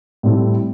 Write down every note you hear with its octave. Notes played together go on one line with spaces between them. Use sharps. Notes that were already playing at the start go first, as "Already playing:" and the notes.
A2 G3 C4 A4